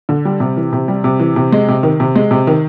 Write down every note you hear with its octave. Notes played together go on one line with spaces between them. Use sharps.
D3
G3
C3
E3
C3
G3
C3
E3
C3
G#3
C3
D#3
C3
G#3
C3
D#3